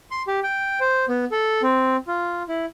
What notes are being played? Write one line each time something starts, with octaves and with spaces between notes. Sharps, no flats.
C6
G4
G5
C5
B3
A4
C4
F4
E4